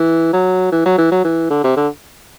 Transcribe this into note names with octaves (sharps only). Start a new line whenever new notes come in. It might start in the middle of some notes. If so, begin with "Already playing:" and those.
Already playing: E3
F#3
E3
F#3
E3
F#3
E3
D3
C3
D3